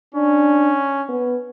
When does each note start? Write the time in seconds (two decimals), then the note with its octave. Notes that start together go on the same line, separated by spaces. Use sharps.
0.15 C#4 D4
1.09 B3